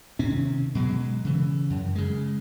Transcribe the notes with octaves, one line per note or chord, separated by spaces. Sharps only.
C3 D#3 C4 C#4
B2 F#3 G#3
C#3 E3
F#2
C#3 G#3